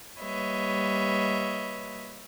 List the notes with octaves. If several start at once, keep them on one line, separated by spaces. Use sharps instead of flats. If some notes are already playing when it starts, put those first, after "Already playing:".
G3 A#3 B4 C#5 D#5 E5